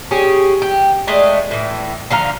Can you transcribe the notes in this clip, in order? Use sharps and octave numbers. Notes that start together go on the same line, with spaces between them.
C#4 G4 G#4
G4
G#3 A3 D4
A2 E3
D3 F3 F5 A#5